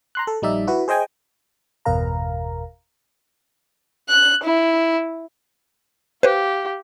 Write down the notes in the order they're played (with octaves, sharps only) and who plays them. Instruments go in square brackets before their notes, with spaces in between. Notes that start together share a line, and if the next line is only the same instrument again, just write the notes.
[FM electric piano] A#5 C6 F#6
A4
A#1 G3 D#4 D5 E5
E4 F#4 B4
G#4 C5 D#5 G5 G#5
G1 E2 B2 A#4 F5 A#5
[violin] F#6
E4
[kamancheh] G4 F5 [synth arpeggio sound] B4 C5